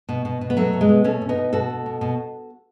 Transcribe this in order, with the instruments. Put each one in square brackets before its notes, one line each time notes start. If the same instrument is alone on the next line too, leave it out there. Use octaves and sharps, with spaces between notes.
[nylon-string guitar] B2
B2
B2
B3
B2 F#3 A3
B2
G#3 B3
B2
B2 A3 C#4
B2
B3 D#4
B2
B2 F#4 A4
B2
B2
B2